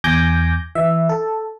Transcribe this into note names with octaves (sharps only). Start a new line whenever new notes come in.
E2 G#5 D6 G6 A#6
E3 E5
A4